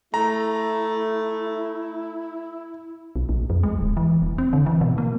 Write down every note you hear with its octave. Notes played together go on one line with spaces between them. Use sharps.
A3 E4 A#5
B1
A#1
F2
G#3
D1
E3
E1
C4
D3
E3
B2
A#3